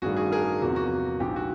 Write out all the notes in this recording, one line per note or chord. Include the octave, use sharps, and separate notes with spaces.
A1 G2 D#3 G3 F#4 G#4
F#4 G#4
G#4 A#4
E2 C3 F3 A#3 F#4
F#4
A#1 G#2 F3 G4
F#4